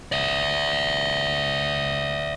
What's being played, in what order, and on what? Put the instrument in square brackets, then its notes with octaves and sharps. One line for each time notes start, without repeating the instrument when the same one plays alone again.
[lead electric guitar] D5 E5